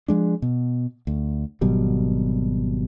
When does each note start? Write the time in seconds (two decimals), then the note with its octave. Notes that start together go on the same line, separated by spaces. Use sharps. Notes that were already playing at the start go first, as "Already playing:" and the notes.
0.08 F3 G#3 D4
0.42 B2
1.07 D2
1.61 G#1 B2 F#3 G3